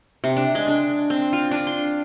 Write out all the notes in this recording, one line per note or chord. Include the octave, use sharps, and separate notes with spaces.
C3
D4
G#3
D4
C4
F4
D4
C6